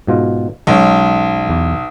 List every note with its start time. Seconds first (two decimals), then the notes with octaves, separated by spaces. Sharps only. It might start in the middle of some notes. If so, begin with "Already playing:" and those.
0.07 G#2 B2 F4
0.67 B1 G#3 C#4
1.49 E2